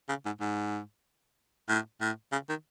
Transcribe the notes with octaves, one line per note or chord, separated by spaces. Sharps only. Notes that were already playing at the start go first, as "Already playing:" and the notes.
C#3
G#2
G#2
A2
A2
C#3
D#3